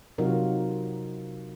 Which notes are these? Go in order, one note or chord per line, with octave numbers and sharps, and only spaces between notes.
C3 F#3 D#4 F4 F#4 A#4